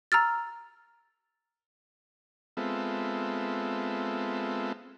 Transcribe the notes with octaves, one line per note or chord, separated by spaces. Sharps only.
A#5 E6 F6 A6
G#3 B3 C4 F4 A4 E5